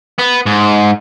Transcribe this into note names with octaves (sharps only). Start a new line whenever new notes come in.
B3
G#2